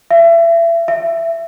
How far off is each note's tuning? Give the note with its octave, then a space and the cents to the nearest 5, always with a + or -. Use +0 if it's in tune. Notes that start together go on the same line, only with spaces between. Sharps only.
E5 +30
E5 +15